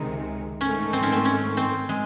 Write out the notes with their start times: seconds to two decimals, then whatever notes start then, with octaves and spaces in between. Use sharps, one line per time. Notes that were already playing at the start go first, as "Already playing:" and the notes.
Already playing: C#2 C3 D#3 G#3 D#4
0.61 G#2 D#3 A3 C#4
0.93 C4
1.03 C#4
1.12 C4
1.25 C#4
1.57 C4
1.89 G#3